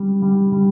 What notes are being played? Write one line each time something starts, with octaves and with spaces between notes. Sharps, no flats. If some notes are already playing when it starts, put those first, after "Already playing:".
Already playing: G3
G3
G3